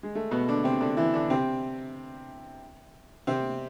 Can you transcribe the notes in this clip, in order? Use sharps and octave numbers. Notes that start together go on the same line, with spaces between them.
G#3
A3
B2 B3
D3 D4
C3 C4
D3 D4
E3 E4
D3 D4
C3 C4
C3 C4